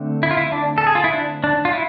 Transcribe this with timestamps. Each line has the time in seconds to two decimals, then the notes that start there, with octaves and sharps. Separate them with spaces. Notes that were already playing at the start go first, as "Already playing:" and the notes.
Already playing: D3 A3 C4
0.23 E4
0.31 F4
0.37 E4
0.52 D4
0.78 A4
0.87 G#4
0.95 F4
1.04 E4
1.12 D4
1.44 D4
1.65 F4
1.73 E4